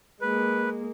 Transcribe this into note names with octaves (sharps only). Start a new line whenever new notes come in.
G#3 A#3 B4